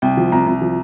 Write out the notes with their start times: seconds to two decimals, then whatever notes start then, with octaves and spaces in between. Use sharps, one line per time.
0.02 C2 G5
0.17 F3
0.32 C2 A#5
0.47 C2
0.61 F3